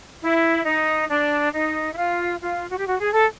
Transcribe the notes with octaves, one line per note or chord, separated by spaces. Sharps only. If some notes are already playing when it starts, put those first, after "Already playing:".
E4
D#4
D4
D#4
E4
F4
F4
F#4
G4
F#4
G#4
A4